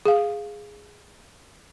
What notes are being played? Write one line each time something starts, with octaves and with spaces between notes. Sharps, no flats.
G#4 F5